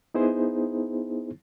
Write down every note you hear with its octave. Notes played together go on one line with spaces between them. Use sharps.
B3 D#4 E4 G#4 C5